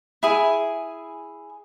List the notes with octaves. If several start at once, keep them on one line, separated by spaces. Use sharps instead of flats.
E4 G#4 G#5